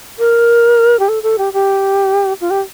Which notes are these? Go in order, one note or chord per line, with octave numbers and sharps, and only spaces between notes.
A#4
G4
A4
A4
G4
G4
F4
G4